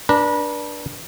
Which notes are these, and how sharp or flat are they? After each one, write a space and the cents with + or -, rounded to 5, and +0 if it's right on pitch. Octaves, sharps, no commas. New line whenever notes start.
D4 +0 B4 -35 A#5 -10